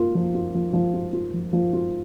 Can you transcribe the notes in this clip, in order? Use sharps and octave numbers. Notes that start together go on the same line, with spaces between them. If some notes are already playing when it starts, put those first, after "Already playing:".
Already playing: A#3 F4
F3
F4
F3
F3
F4
F4
F3
F3
F4